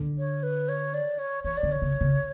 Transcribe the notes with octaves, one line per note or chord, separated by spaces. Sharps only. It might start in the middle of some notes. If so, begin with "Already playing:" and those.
Already playing: D3
C#5
B4
C#5
D5
C#5
E3 C#5
D5
D3
C#5
C#3
C#3